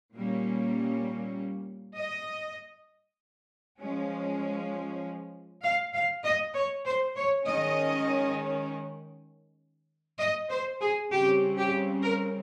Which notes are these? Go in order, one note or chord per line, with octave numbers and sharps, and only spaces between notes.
A#2 G3 A#3 C#4
D#5
F3 G#3 C#4
F5
F5
D#5
C#5
C5
C#5
D#3 G#3 C#4 D#5
D#5
C5
G#4
C#3 G3 C4 G4
G4
A#4